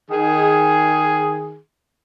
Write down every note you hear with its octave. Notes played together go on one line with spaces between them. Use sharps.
D#3 G#4